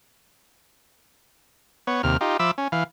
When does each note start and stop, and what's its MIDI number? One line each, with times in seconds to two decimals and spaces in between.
1.87 2.02 59
1.87 2.02 73
2.03 2.17 39
2.03 2.17 48
2.03 2.17 89
2.21 2.37 63
2.21 2.37 65
2.21 2.37 67
2.39 2.51 53
2.39 2.51 76
2.39 2.51 83
2.39 2.51 86
2.39 2.51 88
2.58 2.68 61
2.72 2.84 52
2.72 2.84 77